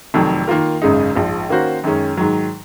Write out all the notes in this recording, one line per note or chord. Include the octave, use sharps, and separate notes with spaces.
F1 F2 D#3 F#3
D#3 A#3 F4 A#4
G#1 F#2 C#3 G#3 D#4
A#1 G#2 F3
D#3 A#3 C#4 F#4 C5
F#2 D#3 G#3 C#4
G#2 D#3 F#3